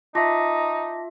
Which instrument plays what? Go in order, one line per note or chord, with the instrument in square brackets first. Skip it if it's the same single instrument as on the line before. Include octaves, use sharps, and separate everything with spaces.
[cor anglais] D#4 [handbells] F4 E5 [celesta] A5 D6 A#6